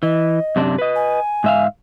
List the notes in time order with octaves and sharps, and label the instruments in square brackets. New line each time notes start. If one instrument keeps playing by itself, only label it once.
[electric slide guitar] E3 [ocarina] D#5
[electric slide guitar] F#2 C3 D4
B4 D#5
[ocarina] G#5
[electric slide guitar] G#2 E5 F5